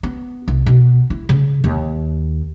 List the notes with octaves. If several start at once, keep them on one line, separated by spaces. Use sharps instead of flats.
B3
C2
B2
E4
C#3
D#2